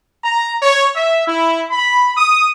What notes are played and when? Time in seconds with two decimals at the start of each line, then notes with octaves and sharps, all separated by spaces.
0.23 A#5
0.61 C#5
0.93 E5
1.26 E4
1.70 B5
2.16 D#6